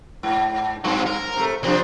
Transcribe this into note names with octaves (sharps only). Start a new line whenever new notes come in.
G#2
G2 F#3 C4
A#4
C3 A3
C2 C3 F3 C4 D4